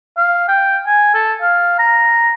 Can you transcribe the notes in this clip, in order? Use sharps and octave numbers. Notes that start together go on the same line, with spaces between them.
F5
G5
G#5
A4
F5
A#5